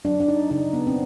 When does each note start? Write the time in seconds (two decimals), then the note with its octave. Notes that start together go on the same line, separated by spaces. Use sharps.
0.05 F#3 D4
0.20 D4
0.28 D#4
0.51 C#3 D#4
0.73 B3
0.87 C4